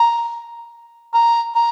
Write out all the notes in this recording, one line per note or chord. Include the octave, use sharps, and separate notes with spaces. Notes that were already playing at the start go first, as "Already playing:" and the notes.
Already playing: A#5
A#5
A#5